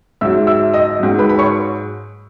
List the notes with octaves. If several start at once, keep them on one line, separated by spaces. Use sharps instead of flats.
G#2 F#3 E5 E6
E5 E6
D#5 D#6
G#2 F#3
B4 B5
B5
C#5 C#6